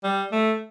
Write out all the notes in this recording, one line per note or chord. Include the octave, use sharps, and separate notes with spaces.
G3
A3